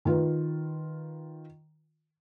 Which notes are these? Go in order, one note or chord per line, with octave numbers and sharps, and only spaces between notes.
D#3 F4 B4